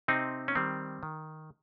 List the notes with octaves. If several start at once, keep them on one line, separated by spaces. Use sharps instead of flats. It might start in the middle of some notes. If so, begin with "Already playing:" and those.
C3 C4 D#4
C#4
D#3 G3 C4
D#3